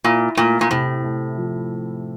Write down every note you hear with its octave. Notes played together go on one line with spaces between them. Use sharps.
A#2 E4
A#2 A3
A#2
A2 C3
A3
F3